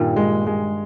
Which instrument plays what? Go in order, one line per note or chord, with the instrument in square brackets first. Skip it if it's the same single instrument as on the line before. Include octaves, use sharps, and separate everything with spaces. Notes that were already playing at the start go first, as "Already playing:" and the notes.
Already playing: [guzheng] G2 D#3 [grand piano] A#2
[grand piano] G#3
G#3